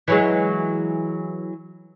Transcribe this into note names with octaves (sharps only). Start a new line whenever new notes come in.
E3 F#3 G#3